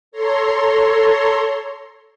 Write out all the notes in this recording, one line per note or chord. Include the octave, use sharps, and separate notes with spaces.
A4 C#5 A#5 C6